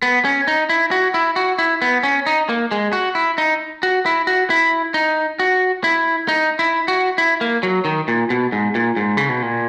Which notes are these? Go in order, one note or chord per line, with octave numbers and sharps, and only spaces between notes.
B3
C#4
D#4
E4
F#4
E4
F#4
E4
B3
C#4
D#4
A#3
G#3
F#4
E4
D#4
F#4
E4
F#4
E4
D#4
F#4
E4
D#4
E4
F#4
E4
A#3
F#3
D#3
A#2
B2
G#2
A#2
G#2
C#3
B2
A#2